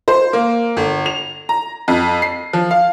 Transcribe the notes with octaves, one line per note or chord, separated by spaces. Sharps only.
C5
A#3
G1
F7
A#5
F2
C7
F3
F5